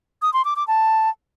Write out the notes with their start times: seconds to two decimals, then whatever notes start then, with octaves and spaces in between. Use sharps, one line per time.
0.22 D#6
0.33 C6
0.45 D6
0.56 D6
0.67 A5